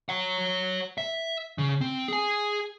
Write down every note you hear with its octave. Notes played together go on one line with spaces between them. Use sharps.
C#5 F#5
E5
C#3
C4
G#4 G#5